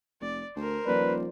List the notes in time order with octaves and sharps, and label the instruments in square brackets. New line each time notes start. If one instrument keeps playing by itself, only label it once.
[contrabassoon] F1 [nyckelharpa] D5
[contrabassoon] D2 [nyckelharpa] A#4 C5
[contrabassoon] D#1 [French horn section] F3 D5 [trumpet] B4